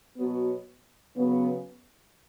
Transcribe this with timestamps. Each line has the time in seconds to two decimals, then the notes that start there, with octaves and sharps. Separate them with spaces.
0.16 B2 F#3 B3
1.16 C#3 F#3 B3